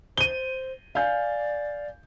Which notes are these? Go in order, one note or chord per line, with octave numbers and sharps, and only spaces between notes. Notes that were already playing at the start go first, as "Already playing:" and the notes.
C5 D#7 G7
D5 F5 G#5 G6